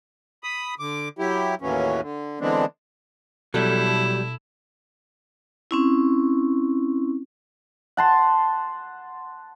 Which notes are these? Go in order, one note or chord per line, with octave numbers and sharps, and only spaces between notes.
B5 D#6
D3 D6
F#3 E4 G4
D#2 A2 E3 F#3 C#4
D3
D3 E3 G#3 B3 C4 D4
B2 F#3 G3 E4 A4
C4 C#4 E4
F#5 A5 C6